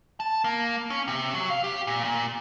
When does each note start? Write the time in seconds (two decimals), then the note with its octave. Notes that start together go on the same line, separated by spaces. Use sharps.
0.20 A5
0.44 A#3
0.90 C#4
1.08 C3
1.34 F#3
1.50 F5
1.64 G4
1.87 A#2
2.04 A#2